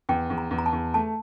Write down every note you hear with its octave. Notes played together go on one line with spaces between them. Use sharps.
E2 G5
E2
A#5
E2
A#5
A5
E2
A3 A5